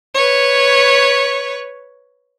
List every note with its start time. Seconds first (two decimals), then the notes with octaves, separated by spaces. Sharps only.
0.14 B4 C#5